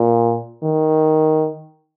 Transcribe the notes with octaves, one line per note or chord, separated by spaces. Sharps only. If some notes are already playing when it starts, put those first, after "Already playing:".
Already playing: A#2
D#3